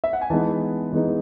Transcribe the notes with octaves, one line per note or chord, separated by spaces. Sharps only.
E5
F#5
G#5
E3 G#3 B3 D#4 A5
E3 G#3 B3 D#4